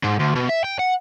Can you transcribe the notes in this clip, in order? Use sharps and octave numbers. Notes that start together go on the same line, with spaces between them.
G#2
D2
B2
E5
G5
F#5